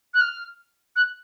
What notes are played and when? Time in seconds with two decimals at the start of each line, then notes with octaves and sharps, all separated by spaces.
0.14 F#6
0.21 F6
0.96 F#6